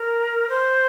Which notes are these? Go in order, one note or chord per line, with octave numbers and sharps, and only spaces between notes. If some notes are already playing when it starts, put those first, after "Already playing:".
Already playing: A#4
C5